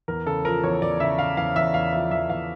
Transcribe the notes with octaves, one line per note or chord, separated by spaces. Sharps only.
E2 A#4
C#3 A4
F3 A#4
E2 C#5
E2 D5
C#3 E5
C#3 F5
E2 F5
E2 E5
E2 F5
F3 E5
E2 E5
E2 F5